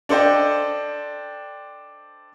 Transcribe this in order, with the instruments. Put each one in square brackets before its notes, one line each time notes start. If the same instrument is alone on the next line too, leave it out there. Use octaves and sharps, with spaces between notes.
[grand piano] D4 A4 C5 D#5 G5